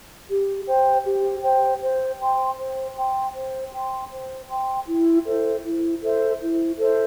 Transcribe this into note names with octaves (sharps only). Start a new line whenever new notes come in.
G4
C5 G5
G4
C5 G5
C5
G5 C6
C5
G5 C6
C5
G5 C6
C5
G5 C6
E4
A4 C5 E5
E4
A4 C5 E5
E4
A4 C5 E5